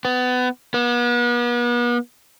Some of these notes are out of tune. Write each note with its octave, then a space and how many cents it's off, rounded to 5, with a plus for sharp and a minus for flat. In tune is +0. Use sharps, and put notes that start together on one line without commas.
B3 +25
B3 -40